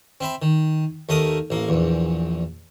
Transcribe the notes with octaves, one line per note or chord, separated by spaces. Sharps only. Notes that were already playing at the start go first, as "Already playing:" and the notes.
C4 E5 B5
D#3
D#2 A3 A#4 D#6
A1 A#3
A#1 E2